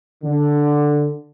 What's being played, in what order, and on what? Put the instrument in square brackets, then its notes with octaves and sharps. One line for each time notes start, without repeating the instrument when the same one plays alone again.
[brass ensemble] D3